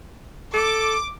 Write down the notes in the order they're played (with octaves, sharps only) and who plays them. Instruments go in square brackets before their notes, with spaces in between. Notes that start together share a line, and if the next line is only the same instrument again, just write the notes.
[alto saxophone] A4 [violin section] D6